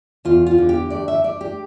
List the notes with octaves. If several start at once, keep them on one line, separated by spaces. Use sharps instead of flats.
E2 F4
F4
D3
G4
A3 D5
E5
D4 D5
G4